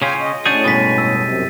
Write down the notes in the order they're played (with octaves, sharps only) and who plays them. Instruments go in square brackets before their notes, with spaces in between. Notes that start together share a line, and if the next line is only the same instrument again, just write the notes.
[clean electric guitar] C#3 C#4 F4 [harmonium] F5 G5 G#5
[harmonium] D#5
[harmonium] A2 C#4 [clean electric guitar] D4 F#4 G#4 [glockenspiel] G6 A6 D#7
[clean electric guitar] G2 B2 G#3 [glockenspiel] A6 B6
[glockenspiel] E6
[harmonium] F#2 C3